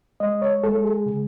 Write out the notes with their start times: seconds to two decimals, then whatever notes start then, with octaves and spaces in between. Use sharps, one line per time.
0.20 G#3 D#5
0.42 C#5
0.63 G#3 A4
0.85 G#4
1.06 C#3